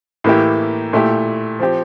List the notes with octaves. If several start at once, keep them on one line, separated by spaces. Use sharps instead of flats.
A2 E3 A#3 E4 G4
A#2 A3 E4 G4
F3 C4 G4